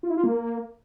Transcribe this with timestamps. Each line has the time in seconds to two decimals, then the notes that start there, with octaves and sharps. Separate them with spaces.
0.03 F4
0.10 E4
0.17 F4
0.24 A#3